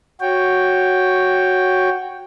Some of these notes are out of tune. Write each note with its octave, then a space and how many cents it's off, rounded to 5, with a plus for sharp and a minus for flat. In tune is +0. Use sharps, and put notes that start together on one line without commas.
F#4 +0 C#5 +0 G5 +0